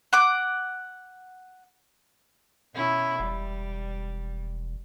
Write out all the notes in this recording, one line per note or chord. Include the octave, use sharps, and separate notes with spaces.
F#5 D6
B2 C#4 E4
E1 G3